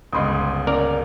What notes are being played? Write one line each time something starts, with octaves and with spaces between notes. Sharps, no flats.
G1 C#2 D#5 C6 D#6
C#4 A#4 D5